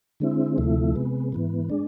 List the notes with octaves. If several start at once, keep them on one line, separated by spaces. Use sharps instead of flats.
D3 G#3 C4 E4
D2 C3 F3 A3 E4
C3 G#3 B3
G#2 E3 B3
G#3 D4